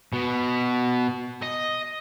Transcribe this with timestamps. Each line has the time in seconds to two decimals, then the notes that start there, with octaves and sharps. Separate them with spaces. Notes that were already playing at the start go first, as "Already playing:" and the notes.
0.13 B2
1.43 D#5